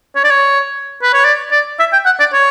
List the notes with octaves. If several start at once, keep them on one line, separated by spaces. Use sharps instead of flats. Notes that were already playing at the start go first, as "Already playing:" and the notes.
C#5
D5
C#5
B4
C#5
D5
D5
E5
G5
F#5
D5
C#5